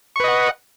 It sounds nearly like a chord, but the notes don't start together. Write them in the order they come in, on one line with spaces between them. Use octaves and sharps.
C#6 B4 D#5 F#5